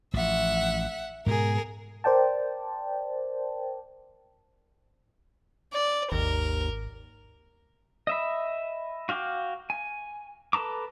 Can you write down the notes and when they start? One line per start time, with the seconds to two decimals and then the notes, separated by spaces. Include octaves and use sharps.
0.14 A1 F3 E5 F#5
1.26 G#2 B2 G#4 A#4
2.04 A#4 C5 D5 G5 A5
5.73 D5
6.12 G#1 D#2 A#4
8.07 D#5 E5 B5
9.09 F#4 F5 G5 D6
9.70 G#5
10.53 A4 B4 A5 A#5 D6